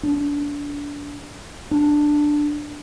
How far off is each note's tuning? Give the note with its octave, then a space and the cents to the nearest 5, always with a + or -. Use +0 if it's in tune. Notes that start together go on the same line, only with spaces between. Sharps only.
D4 -25
D4 +5